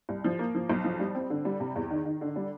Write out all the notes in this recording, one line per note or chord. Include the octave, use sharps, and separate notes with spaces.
C2
F3
A#3
F3
B1
F3
G3
C4
D3
G3
C3
E2
D#3
D#3
D3
G3